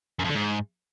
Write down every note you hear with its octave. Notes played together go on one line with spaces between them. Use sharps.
F#2
F2
D3
G#2